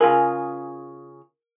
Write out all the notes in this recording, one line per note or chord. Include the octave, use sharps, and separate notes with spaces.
C#3 F4 G#4 A#4 G#5